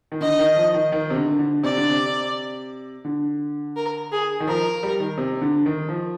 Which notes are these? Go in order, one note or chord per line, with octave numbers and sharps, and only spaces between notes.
D#3
D3 D#5
D#3
F3
D#3
D#3
C3
D3
D3
C3 D5
D3
C3
D3
A#4
G#4
D#3
F3 A#4
G3
D#3
C3
D3
D#3
F3